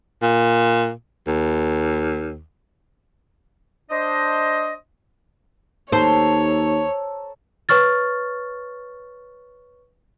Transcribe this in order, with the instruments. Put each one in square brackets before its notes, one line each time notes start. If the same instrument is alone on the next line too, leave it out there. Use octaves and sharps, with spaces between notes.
[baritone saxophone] A#2
D#2
[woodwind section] D4 C5 D#5
[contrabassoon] D#2 [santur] A4 A5 A#5 [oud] C5 [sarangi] C#5
[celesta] B4 C#5 C#6 F6 A6